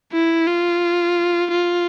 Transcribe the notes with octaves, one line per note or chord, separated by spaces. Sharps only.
E4
F4
F4